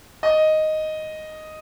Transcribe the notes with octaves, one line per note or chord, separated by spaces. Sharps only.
D#5